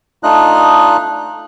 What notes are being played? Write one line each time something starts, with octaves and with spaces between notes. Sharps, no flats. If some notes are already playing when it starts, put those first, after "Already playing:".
A3 D4 D#4 F4 D#5 F#6